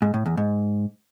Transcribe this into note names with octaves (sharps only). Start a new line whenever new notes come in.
G#2
A2
E2
G#2